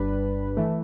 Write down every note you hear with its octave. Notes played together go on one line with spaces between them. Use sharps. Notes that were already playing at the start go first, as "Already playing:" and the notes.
Already playing: G1 G2 G3 D4 B4
E3 A3